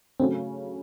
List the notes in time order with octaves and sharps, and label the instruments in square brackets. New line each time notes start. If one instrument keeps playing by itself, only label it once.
[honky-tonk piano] C#3 F#3 A3 C#4 F#4 [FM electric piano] C4